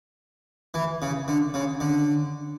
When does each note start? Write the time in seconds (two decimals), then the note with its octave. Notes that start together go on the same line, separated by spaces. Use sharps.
0.74 E3
1.02 C#3
1.28 D3
1.54 C#3
1.80 D3